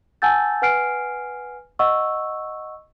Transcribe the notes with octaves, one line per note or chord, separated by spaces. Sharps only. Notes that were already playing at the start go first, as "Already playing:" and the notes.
F#5 G#5 A5 E6 G6 A6
B4 F#5 G#5 F6 C7 D7
D#5 F#5 C#6 E6